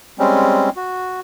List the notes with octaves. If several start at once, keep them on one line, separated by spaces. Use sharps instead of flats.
G3 G#3 C4 C#4
F#4